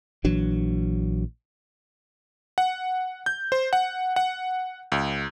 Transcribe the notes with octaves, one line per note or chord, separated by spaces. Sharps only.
A#1 E3 F#3 D4
F#5
G6
C5
F#5
F#5
C#2